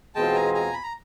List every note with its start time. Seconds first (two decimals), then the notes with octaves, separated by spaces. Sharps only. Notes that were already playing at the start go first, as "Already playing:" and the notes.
0.15 E2 B2 G#3 C4 F4 G5 A5
0.35 G#5 A#5
0.54 G#5 A#5
0.73 B5
0.83 A#5